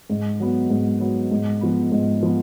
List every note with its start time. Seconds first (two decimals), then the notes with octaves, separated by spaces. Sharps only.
0.10 G#2
0.40 F#3 B3
0.70 G#2
1.00 F#3 B3
1.31 G#2
1.61 F3 B3
1.92 G#2
2.23 F3 B3